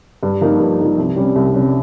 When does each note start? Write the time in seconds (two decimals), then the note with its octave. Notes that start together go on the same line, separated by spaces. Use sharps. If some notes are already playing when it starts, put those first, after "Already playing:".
0.23 G2
0.41 F3 A#3 D#4
0.60 G2
0.79 F3 A#3 D#4
0.98 C2
1.16 C3 G3 C#4
1.36 C2
1.54 C3 G3 C#4